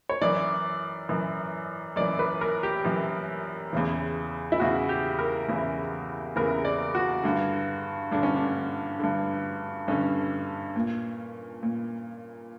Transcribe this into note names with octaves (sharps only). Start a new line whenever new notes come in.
C#5
F#2 E3 D5
F#2 E3
F#2 E3 D5
B4
A#4
G4
F#2 E3
E2 C#3 E3
E4
E2 C#3 E3 F#4
G4
A#4
E2 C#3 E3
E2 C#3 E3 A#4
D5
F#4
G2 D3
G2 D3 D4
C#4
D4
G2 D3
G2 D3 C#4
A#2
A#2